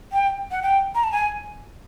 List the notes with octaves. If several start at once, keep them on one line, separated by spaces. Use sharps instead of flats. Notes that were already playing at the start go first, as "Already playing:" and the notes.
G5
F#5
G5
A#5
A5
G#5